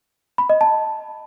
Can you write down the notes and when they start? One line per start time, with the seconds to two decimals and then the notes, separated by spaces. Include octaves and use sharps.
0.38 B5
0.50 D#5
0.61 A5